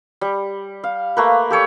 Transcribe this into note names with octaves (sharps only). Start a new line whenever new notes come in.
G3
F5
A3 A#3 B4
G4 A4 C#5 D5